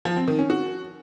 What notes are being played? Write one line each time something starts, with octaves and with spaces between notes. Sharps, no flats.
F3
C4
D#3
C#4
F#4